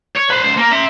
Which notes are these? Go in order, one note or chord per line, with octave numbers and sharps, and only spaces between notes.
C#5
B4 C5
C#2 C5
A#3 A#4
E5 C6